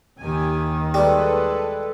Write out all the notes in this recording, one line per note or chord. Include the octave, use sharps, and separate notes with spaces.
D#2 D#3 G4 G#5
G3 G#3 A4 B4